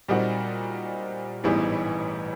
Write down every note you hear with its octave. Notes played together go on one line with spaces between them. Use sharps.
A#2 G3 C4 D#4 F#4
A1 G#2 E3 G3 B3